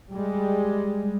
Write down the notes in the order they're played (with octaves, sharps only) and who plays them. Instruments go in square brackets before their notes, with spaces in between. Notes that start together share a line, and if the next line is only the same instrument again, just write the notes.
[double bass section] G3 G#3